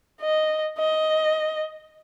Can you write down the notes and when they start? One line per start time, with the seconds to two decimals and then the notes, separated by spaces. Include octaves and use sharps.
0.21 D#5
0.78 D#5